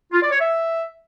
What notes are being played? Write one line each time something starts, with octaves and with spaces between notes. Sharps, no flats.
F4
D5
C#5
E5